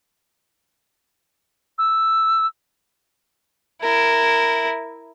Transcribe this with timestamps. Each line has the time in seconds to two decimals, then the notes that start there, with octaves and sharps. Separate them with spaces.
1.78 E6
3.82 E4 A#4